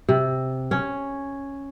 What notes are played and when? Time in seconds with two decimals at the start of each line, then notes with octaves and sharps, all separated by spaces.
0.09 C3
0.71 C#4